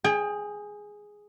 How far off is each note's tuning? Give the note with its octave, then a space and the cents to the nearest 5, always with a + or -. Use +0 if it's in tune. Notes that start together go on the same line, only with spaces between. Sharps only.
G#4 +0 G5 +30